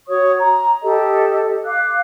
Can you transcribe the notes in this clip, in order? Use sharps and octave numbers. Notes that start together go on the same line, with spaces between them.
F#4 C#5 C#6 D#6
A#5
G4 A4 D#5
F5 D6 F#6